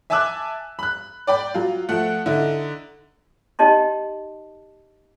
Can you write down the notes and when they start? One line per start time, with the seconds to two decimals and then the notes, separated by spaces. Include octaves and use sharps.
0.10 E5 G#5 A5 D6 E6 F#6
0.79 B5 F#6
1.27 D5 G5 B5
1.54 F#3 F4
1.89 F3 A3 F#5
2.26 D3 D#4 E4
3.59 D#4 G4 D#5 A5 C6